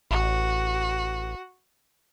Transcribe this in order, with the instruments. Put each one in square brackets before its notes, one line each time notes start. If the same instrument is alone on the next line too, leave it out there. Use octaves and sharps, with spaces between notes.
[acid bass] A1 [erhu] F#4